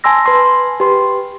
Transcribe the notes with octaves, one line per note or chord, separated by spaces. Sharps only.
G#5 A5 C6 E6 A#6
B4 G#5 C6
G4 B4 C6